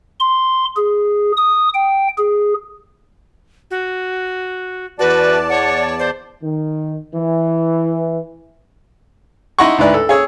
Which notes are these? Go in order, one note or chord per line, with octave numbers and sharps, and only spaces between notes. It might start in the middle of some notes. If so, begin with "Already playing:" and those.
C6
G#4
D#6
G5
G#4
F#4
E2 F#4 B4 D5 A5
C#5 F#5
C5
D#3
E3
D#4 E4 D#5 F#5 C6 C#6
D2 G#2 D4 E4 B4 D5
A4
G#4 C#5 E6